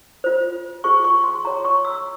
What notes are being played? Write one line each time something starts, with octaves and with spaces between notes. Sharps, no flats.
F4 C5
F4 G#4 C5 C#6
C#6
C6
F4 G#4 C#5 A#5
C#6
E6